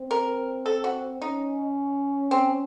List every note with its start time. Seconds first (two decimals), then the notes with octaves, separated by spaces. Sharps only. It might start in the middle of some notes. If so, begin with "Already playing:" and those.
Already playing: C4
0.11 A#4
0.66 A4
0.84 F#4
1.21 C#4 D#4
2.31 C4